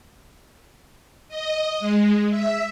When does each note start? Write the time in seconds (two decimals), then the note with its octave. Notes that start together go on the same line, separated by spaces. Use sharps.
1.28 D#5
1.80 G#3
2.30 E5